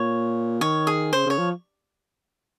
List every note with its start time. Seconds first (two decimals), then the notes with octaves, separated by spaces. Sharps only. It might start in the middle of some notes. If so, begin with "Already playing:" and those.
Already playing: A#2 C#5
0.61 D#3 C#5
0.87 G#4
1.13 C#3 C5
1.26 C#3 C#5
1.38 F3